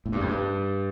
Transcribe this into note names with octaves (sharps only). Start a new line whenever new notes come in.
A2
G2
F2
G2